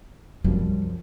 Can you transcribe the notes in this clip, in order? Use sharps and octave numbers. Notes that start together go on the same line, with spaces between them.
C2 F#2 F3 G3